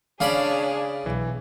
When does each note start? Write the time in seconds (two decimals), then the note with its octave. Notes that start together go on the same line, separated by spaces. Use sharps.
0.20 C#3 D4 G#4 C#5 D5 F5 B5
1.06 B1 E3